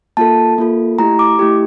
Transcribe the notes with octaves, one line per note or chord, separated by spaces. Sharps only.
A#3 F4 A4 A5
A#3 F4 A4
A3 E4 G4 A#5
D6
A3 E4 G4